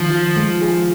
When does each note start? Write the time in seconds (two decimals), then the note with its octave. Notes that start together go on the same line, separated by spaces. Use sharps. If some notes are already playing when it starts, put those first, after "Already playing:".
Already playing: D#3 F3
0.11 F4
0.37 G#3
0.62 G#4